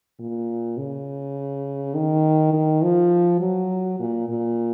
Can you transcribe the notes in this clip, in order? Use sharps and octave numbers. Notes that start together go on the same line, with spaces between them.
A#2
C#3
D#3
D#3
F3
F#3
A#2
A#2